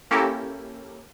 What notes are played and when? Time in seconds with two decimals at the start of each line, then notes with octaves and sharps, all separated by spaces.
0.11 A#3 C#4 E4 G4 A4 A#4